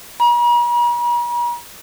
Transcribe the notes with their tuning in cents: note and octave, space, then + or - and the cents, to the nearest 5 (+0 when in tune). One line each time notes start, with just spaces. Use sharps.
A#5 +45